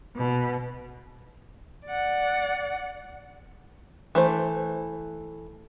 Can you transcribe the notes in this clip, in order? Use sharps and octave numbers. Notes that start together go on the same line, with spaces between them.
B2
D5 F#5
E3 A3 C5